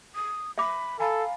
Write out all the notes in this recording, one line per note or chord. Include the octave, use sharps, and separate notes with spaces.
D#6
E5 B5 D6
A4 F5 G#5 A#5 B5